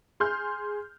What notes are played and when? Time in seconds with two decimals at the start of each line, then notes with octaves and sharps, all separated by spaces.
0.20 G#4 C6 F6 G6